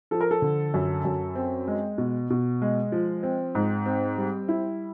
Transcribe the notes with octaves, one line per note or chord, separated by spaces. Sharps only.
F3 A4
A#4
A4
D3
F#2
F#2
C4
G#3
B2
B2
G#3
F3
C4
G#2
C4
G3
E4